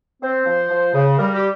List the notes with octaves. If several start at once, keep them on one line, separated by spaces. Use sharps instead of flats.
C4 C5
F3
F3
C#3
G3 A#4
G4